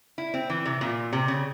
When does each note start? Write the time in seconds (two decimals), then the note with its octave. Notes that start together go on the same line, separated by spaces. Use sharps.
0.18 E4
0.34 C4
0.50 E3
0.65 C3
0.81 A#2
1.13 C3
1.28 C#3